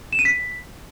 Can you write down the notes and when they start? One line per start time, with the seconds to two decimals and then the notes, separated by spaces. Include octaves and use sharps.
0.13 E7
0.19 D#7
0.25 B6